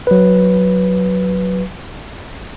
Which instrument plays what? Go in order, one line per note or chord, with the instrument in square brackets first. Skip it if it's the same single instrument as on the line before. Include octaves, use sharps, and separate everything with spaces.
[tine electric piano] F#3 B4